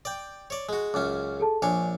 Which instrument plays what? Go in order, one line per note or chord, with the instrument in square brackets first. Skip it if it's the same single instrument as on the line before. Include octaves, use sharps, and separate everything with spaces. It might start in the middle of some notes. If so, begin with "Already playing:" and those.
[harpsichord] D5 G5
C#5 D5
G#3 F#4
[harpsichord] C#2 F#2 C#4 [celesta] D6
[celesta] G#4 A4 A5
[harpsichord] A#1 D4 C#5 [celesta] G#5